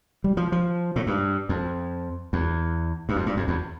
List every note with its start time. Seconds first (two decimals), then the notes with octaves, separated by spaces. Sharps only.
0.24 G3
0.37 F3
0.52 F3
0.96 A2
1.07 G2
1.49 F2
2.33 E2
3.09 G2
3.16 F2
3.26 G2
3.37 F2
3.48 E2